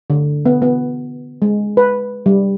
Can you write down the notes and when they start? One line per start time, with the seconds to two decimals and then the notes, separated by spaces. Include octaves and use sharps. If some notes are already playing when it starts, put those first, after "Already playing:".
0.10 D3
0.46 B3
0.62 B3
1.42 G#3
1.77 B4
2.26 G3